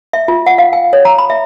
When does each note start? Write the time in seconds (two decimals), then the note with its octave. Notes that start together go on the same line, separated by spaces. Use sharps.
0.13 E5
0.28 F4
0.46 F#5
0.58 F5
0.73 G5
0.93 C#5
1.05 A#5
1.18 B5
1.30 E5